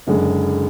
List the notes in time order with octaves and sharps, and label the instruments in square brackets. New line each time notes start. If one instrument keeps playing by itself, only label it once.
[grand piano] F#1 F#2 D3 G#3